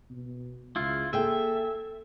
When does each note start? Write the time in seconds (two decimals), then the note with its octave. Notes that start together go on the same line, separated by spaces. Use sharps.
0.10 B2
0.76 C#2 C#3 E4 F4
1.13 A#3 G#4 A4 E5 G5